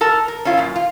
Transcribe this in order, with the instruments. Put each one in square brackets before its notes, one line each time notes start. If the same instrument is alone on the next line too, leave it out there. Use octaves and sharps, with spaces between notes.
[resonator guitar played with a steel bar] A4 A#4 A5
A#4
C#4 E4 F4
F#2 A#2
F4